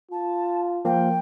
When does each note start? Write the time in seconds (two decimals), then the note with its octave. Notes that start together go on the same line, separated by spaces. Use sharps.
0.12 F4 A5
0.85 F3 A#3 G5